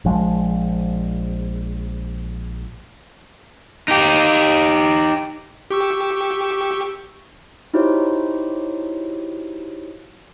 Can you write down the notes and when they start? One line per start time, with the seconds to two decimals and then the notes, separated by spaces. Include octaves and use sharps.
0.05 A#1 F3 G#3
3.88 D#4 G4
5.71 G4 C#6 E6
7.74 D#4 E4 F#4 G4 C5 C#5